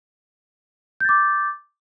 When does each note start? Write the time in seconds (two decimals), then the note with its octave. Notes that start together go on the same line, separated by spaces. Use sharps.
1.00 G6
1.05 A6
1.09 D6